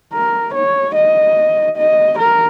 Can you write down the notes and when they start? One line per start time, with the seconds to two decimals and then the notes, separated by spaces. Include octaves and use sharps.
0.13 A#4
0.55 C#5
0.95 D#5
1.78 D#5
2.19 A#4